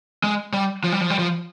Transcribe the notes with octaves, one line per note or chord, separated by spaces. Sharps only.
G#3
G3
F3
G3
F3
G3
F3